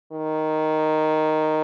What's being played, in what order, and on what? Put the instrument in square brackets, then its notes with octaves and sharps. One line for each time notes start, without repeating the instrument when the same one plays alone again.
[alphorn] D#3